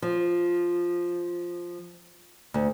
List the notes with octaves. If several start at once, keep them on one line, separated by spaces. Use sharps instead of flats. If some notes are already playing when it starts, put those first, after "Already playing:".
F3
D2